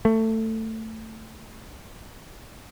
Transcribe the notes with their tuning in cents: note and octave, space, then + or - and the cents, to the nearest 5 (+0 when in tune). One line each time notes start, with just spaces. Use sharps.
A3 +15